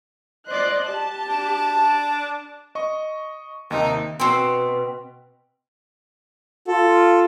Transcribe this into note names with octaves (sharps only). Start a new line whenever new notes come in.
C5 D5 D#5 F#6
G4 A5
D4
D#5 C#6
D#2 C3 D#4
B2 C4
F4 A4